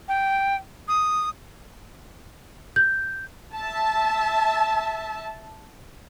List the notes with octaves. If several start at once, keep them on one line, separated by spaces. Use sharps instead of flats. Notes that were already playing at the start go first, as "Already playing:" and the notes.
G5
D#6
G6
E5 A5